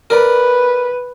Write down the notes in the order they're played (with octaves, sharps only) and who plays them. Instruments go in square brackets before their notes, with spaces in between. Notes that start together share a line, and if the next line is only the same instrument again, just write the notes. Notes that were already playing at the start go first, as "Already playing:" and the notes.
[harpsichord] A#4 D5 [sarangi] B4